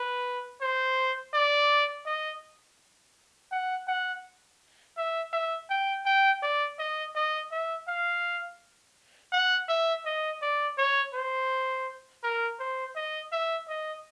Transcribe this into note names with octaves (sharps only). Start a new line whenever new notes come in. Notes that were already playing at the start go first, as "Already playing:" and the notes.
Already playing: B4
C5
D5
D#5
F#5
F#5
E5
E5
G5
G5
D5
D#5
D#5
E5
F5
F#5
E5
D#5
D5
C#5
C5
A#4
C5
D#5
E5
D#5